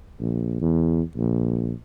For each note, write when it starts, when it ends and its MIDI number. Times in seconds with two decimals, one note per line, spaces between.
0.21 0.61 34
0.61 1.02 40
1.16 1.72 34